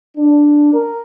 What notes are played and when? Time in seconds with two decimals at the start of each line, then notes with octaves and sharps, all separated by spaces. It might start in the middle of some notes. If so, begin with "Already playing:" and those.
0.17 D4
0.73 A#4